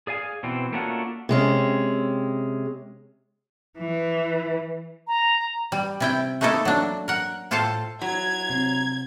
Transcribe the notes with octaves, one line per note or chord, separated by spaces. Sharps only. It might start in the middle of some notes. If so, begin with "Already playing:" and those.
G#4 D5 F5 G#5
B2 E3 C4
A3 A#3 C#4 D4 F4 F#4
C3 G#3 C#4
E3
A#5
G3
C3 E4 G5
A3 A#3 D#4 E4 A4
F#3 D4
A#4 F#5
A2 F4 A4 C5 F5 A5
F#3 A#5 G#6
C3 C4